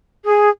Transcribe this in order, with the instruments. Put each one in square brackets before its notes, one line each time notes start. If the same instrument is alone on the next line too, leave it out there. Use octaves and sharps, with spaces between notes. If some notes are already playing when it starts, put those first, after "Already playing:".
[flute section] G#4